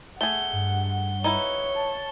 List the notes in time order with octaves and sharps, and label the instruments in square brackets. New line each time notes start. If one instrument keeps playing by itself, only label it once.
[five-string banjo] A3 G#4 [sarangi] F#5 [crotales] G7
[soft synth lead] G2
[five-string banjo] D#4 E4 B4 [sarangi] C#5 [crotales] G7
[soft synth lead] A5